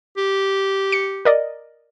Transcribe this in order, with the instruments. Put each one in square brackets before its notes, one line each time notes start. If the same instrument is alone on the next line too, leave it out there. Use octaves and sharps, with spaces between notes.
[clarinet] G4
[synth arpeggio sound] C#7
A#4 D5 D#5